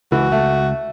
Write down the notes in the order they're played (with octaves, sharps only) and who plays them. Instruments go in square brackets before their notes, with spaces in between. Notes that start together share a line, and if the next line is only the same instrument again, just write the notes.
[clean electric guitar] C#2 [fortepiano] E3 [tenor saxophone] F#4
[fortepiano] A3